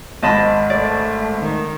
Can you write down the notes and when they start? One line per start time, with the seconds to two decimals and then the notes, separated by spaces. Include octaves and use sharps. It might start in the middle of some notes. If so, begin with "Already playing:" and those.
0.23 G#1 D#5 A5 B5
0.70 A3 D5
1.39 D#3